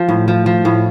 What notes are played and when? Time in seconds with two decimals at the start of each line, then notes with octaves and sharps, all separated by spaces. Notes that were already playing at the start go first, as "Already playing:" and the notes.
Already playing: F3
0.09 A2
0.28 F3
0.46 F3
0.65 A2